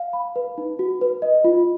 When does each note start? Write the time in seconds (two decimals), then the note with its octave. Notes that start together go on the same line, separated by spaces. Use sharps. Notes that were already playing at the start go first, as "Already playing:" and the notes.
Already playing: F5
0.13 B5
0.36 B4
0.58 D#4
0.79 F#4
1.01 B4
1.22 D#5
1.44 F4